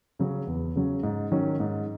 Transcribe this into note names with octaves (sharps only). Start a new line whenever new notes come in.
C#3 F#3 C#4
E2
C#3 F#3 C#4
G#2
D#3 F#3 C#4
G#2